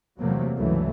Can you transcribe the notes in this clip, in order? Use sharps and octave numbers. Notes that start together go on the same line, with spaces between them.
E2 C3 F#3 A3 A#3
C#2 G2 E3 F#3 A3